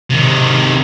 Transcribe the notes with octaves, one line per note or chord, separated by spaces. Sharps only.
C3 D#3